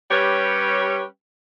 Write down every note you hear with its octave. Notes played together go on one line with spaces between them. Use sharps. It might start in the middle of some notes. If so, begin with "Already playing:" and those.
G3 C#4 G4 B4 C#5